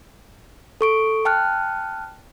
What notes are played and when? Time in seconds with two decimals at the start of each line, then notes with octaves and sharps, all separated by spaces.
0.81 A4 C#6 D7
1.25 G5 A5 F6 F#6